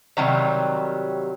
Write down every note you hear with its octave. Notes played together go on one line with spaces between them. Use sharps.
C3 D#3 F#3 G3